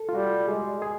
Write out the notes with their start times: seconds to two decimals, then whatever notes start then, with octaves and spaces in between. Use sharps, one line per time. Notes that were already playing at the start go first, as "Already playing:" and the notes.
Already playing: A4
0.09 F4
0.15 G3 F#4
0.48 G#3 G#4
0.82 G#4